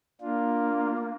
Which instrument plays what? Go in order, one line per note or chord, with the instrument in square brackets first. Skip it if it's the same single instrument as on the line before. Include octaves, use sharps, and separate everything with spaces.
[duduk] A#3 [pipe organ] D4 F4